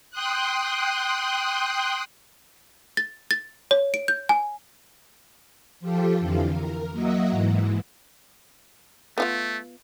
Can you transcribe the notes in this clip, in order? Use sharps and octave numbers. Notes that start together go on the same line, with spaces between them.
G5 C6 D#6 F#6
A6
A6
C#5
D7
G6
G#5
F3 F4 G4 A4
F2 D3 E3 F5
A#4
F#3 A#3 D#5 E5 F#5
G#2 E3
A3 B3 F4 F5